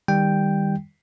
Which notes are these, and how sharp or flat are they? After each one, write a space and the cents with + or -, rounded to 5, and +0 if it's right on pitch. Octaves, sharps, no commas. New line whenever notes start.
D#3 +0 G3 +15 G5 +0